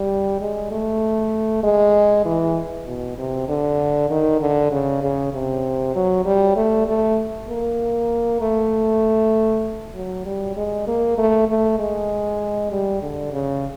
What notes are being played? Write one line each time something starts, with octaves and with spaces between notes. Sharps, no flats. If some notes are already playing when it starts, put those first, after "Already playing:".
Already playing: G3
G#3
A3
G#3
E3
B2
C3
D3
D#3
D3
C#3
C#3
C3
F#3
G3
A3
A3
A#3
A3
F#3
G3
G#3
A#3
A3
A3
G#3
G3
D3
C#3